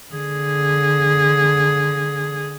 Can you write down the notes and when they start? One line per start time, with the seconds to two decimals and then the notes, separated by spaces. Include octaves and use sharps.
0.13 D3 G#4